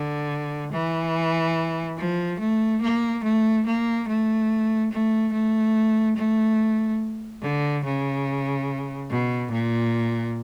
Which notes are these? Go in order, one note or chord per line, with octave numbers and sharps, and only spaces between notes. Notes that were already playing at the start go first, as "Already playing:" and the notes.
Already playing: D3
E3
F3
A3
A#3
A3
A#3
A3
A3
A3
A3
D3
C#3
B2
A#2